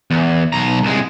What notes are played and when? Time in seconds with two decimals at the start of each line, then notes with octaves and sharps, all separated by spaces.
0.11 E2
0.53 B1 A#5
0.83 C2 G#3